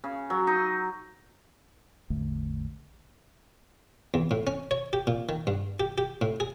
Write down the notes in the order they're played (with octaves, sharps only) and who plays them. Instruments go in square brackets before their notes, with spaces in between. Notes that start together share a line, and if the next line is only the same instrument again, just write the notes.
[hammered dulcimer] C#3
F#3
D#4
[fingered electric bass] A1 E2 D3 A3
[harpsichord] E2
A2
C#4
C#5
G4
A#2
D#3
G2
G4
G4
A2
G#4